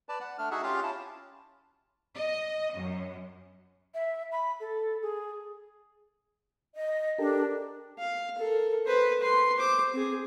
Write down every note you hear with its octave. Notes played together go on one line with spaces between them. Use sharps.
B4 D5 A5
F#5
A3 D4 F6
D#4 F#4 G#4 E5 F#5
C#4 F4 G4 F5
C#4 E4 A5
D#5
F#2
E5
B5
A4
G#4
D#5
D4 G4 A4 A#4
F5
A4 A#4
B4 C5
B4 C6
C5 D6
C4 G#4